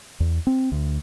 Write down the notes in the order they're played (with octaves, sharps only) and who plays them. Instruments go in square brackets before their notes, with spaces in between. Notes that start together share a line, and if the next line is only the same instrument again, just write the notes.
[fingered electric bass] E2
C4
D2